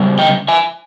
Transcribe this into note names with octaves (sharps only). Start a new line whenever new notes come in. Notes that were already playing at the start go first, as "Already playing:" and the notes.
Already playing: C#3 G3
D#5 G5
E5 G#5